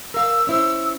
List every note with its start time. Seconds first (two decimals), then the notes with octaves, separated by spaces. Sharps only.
0.14 A#4 F5 E6
0.47 C#4 E4 C5 E6